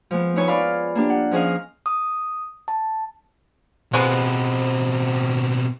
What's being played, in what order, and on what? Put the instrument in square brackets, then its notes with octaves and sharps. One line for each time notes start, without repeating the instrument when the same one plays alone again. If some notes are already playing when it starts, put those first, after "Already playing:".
[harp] F3 G#3 B3
B3 D#4 E4 B4 C#5 G#5
F4 D5 F5 B5
A#3 D4 G4
F#5
F3 C#4 G#4 D#5 F5
[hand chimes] D#6
A5
[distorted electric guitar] B2 C4 [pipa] F3 G#3 B3